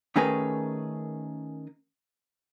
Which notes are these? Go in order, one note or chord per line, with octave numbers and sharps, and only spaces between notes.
D#3 A3 C#4 G#4 A#4 B4